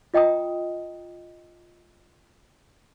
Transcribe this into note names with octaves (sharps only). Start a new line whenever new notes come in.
F4 D#5 G5 A#5 D#6